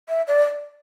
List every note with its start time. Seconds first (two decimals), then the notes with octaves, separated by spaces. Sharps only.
0.09 E5
0.27 D5